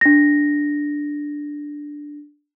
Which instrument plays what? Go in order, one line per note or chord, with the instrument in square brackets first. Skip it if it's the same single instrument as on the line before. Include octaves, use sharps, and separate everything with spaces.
[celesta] D4 A#6